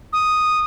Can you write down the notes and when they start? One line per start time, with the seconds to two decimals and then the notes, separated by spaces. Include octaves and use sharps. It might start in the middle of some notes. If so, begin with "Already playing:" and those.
0.13 D#6